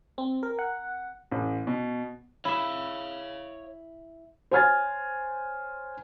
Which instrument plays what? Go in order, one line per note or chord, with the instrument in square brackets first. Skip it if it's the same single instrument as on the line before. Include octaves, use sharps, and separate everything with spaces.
[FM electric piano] C4
A#4
F#5
[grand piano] A1
B2
[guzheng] E4 E5 [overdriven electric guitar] C#5 F5
[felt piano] C5 C#5 G#5 F6 G#6 A6